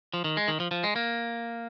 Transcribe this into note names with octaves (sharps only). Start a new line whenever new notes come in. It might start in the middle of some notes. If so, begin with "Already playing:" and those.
F3
D#3
G#3
D#3
F3
F3
G#3
A#3